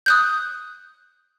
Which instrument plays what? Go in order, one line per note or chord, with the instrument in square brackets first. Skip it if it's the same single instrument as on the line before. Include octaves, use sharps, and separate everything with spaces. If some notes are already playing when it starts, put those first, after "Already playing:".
[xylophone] D#6 F#6 G6